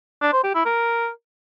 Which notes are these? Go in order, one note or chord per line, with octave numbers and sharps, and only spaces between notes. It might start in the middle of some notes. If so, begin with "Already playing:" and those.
D4
C5
G4
E4
A#4